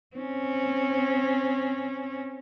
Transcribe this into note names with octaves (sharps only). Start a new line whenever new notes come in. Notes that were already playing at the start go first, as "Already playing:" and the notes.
C4 C#4